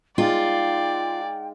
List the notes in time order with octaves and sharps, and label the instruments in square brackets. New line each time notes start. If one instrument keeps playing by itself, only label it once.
[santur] G#3 D#4 F5 [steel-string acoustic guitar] F4 [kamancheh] D5 [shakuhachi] G5